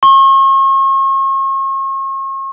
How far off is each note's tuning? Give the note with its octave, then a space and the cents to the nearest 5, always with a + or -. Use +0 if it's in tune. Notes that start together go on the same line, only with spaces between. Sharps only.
C#6 -40